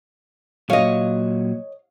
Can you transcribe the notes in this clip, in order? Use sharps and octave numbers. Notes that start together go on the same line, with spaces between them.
A#2 F#3 C#5 D#5 F5